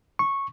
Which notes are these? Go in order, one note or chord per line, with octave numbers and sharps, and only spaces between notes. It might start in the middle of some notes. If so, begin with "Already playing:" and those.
C#6